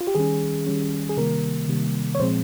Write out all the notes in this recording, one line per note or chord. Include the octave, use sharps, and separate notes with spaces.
F4
G4
D#3 G3 C#4 G#4
D#3 G3 C#4
G#4
C3 D#3 G3 A#3 A#4
C3 D#3 G3 A#3
C#5
A#2 F3 G#3 C4 C5